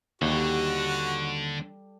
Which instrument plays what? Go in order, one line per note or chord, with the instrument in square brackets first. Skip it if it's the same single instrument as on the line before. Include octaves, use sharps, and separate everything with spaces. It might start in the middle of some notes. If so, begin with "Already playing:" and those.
[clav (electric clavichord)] D#2 [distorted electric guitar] D3 [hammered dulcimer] G3 G4 A4 [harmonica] F#4